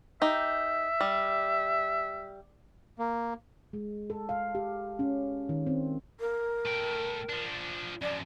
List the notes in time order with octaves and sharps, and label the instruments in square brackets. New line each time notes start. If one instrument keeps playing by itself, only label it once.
[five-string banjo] D#4 G4 [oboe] E5
[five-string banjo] G3
[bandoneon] A#3
[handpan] G#3
A4
F5
G4
C#4
D#3
C4
[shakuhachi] A#4
[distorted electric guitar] A3 G5
F3 D4
[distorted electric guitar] F#2 F3 [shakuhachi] D5